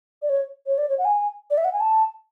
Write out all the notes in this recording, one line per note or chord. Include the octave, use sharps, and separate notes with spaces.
D5
C#5
C#5
D5
C#5
F#5
G#5
D5
E5
F#5
G#5
A5